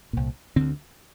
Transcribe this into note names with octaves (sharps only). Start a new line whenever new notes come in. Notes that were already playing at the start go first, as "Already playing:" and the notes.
C2 A#2
D2 D3 C4